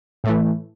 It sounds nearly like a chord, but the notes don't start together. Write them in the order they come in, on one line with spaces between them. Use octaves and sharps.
A2 A3 E3